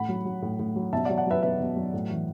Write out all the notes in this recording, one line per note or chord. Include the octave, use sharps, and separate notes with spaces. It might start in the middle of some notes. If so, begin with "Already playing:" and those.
Already playing: A2 F#5 B5
F#3
F#3
A2
A2
F#3
B2 E5 A5
D5 F#5
F#3
D5 F#5
F#3 B4 E5
B2 B4 E5
B2
F#3
A2
E3